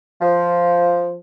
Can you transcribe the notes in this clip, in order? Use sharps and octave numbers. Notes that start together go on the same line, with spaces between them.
F3